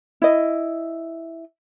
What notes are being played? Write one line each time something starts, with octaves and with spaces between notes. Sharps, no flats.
E4 D#5